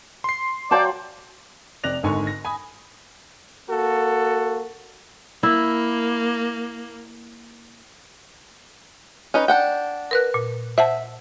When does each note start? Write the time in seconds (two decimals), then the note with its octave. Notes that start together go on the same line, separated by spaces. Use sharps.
0.24 C6 C7
0.71 F#3 C5 D5 F5 G5 A5
1.84 F1 C3 D5 F#6 A#6 F7
2.03 G#1 G#2 D3 G#5 C#6
2.27 A#6
2.45 G#5 B5 D#6
3.70 A#3 F#4 A4
5.43 A#3 E4
9.34 C#4 D#4 B4
9.48 D4 F#5 G5
10.11 A#4 B4 F#6
10.34 A#2
10.78 C5 E5 F#5 A5